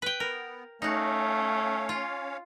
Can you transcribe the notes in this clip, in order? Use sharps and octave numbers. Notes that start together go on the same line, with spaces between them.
B4 G5
B3 A#4
A3 C#4 D#4 F#4 C#5 F5
F4